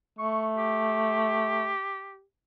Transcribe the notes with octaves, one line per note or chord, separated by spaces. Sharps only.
A3 C#6
G4